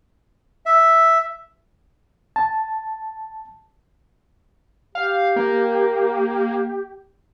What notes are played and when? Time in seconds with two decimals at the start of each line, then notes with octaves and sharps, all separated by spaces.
0.66 E5
2.36 A5
4.95 G4 F5
5.36 A#3